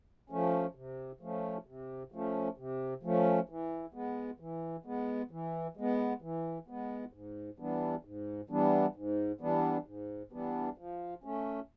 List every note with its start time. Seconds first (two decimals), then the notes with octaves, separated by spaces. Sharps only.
0.30 F3 A3 C#4
0.75 C3
1.21 F3 A3 C#4
1.66 C3
2.12 F3 A3 C#4
2.57 C3
3.03 F3 A3 C#4
3.49 E3
3.94 G#3 B3
4.40 E3
4.85 G#3 B3
5.31 E3
5.77 G#3 B3
6.22 E3
6.68 G#3 B3
7.13 G#2
7.59 E3 G3 B3 D4
8.05 G#2
8.50 E3 G3 B3 D4
8.96 G#2
9.41 E3 G3 B3 D4
9.86 G#2
10.32 E3 G3 B3 D4
10.78 F3
11.24 A3 C#4